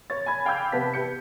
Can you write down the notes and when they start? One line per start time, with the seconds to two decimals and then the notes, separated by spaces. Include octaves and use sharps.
0.10 C#5 A6
0.26 G#5 B5 G#6
0.45 F5 G5 B5 D6 E6 G6
0.72 C3 B3 B4 A5 B6
0.94 G4 G6 C#7